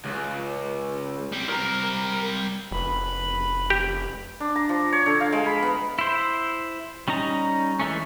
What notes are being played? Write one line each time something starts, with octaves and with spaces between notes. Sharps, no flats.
C#2
G3 C4
A#4 A#5
F1 B4 B5
G4
D4
A#5
F3
C#5
D3
F5
G#3
B5
B3
E4 C5
G3 C#4 D#4 A#5
E3 G#3 A3 C#4